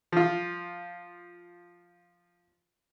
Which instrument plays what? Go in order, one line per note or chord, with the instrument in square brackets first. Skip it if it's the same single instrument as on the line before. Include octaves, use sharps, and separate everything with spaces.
[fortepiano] F3 F4